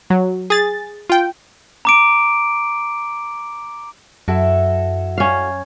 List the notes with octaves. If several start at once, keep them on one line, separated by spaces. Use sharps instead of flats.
F#3
G#4 A6
F4 G5
A#5 D6 D7
F#2 E4 F#4 A4
C#4 F5